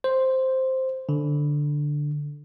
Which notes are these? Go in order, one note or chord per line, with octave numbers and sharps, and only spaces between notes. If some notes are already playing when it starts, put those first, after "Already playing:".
C5
D3